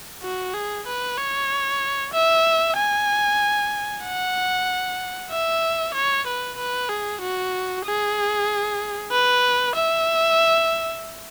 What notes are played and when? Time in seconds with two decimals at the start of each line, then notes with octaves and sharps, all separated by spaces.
0.23 F#4
0.54 G#4
0.87 B4
1.18 C#5
2.13 E5
2.77 G#5
4.04 F#5
5.31 E5
5.94 C#5
6.27 B4
6.58 B4
6.89 G#4
7.21 F#4
7.85 G#4
9.12 B4
9.75 E5